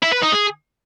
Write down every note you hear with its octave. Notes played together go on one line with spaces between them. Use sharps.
E4
B4
D#4
G#4